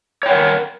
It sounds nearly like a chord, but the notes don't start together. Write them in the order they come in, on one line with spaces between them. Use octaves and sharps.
C#5 G5 F#5 A#4